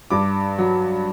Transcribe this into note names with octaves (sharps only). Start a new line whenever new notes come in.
G2 D6
F#3